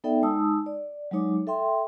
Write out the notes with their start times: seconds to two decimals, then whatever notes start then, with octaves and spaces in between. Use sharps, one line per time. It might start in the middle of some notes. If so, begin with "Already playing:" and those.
0.04 B3 D#4 A4 D5 E5 G5
0.22 G#3 D#4 A5 D#6 E6
0.66 D5
1.11 F#3 G#3 D#4 C#5 D6
1.47 A4 E5 G5 C6